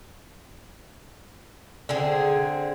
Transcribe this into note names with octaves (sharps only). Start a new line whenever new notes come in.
D3 C4 G#4